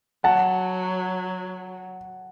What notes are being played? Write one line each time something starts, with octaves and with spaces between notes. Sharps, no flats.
F#3 F#5 A5